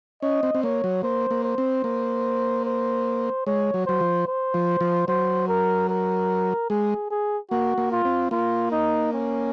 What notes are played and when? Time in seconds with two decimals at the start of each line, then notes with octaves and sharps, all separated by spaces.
0.22 C#4 D#5
0.43 C4
0.55 C4
0.63 A#3 C#5
0.84 F#3
1.03 A#3 C5
1.31 A#3
1.44 C5
1.58 C4
1.84 A#3
2.66 C5
3.47 G#3 C#5
3.74 F#3
3.86 F#3 C5
4.01 F3
4.27 C5
4.54 F3
4.81 F3
5.08 F#3 C5
5.48 A#4
5.90 A#4
6.70 G#3 G#4
7.10 G#4
7.51 A#3 F#4
7.78 A#3
7.92 F4
8.05 C4
8.31 A#3 F4
8.72 D#4
9.13 C#4